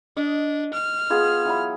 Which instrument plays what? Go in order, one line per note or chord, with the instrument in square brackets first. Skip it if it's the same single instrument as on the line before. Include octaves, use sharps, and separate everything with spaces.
[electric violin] D4 [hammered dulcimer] D#5
[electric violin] F6
[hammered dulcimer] B3 F4 G#4
E3 F#3 B5